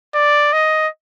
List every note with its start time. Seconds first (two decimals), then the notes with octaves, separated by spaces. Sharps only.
0.15 D5
0.53 D#5